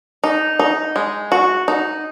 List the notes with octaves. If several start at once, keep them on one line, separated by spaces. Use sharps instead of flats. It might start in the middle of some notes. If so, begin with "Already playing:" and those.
D#4
D#4
G#3
F#4
D#4